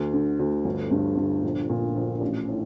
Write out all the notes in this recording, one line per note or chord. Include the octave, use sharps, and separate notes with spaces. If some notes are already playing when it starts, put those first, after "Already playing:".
Already playing: D2
D3
D2
G1
G2
G1
A#1
A#2
A#1
A1
A2